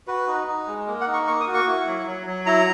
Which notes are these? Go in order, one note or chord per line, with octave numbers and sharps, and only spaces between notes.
F#4 B4
D#4
D#4
G#3
A#3
F#5
D#4
C#6
A#3 C#6
D#6
F#4
C#6
E4
F#3
F#3
F#3
E4 A#5